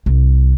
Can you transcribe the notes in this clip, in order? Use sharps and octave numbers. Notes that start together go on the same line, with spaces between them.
C2